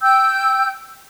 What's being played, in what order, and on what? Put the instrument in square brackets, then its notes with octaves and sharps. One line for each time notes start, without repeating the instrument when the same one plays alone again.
[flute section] G5 E6 G6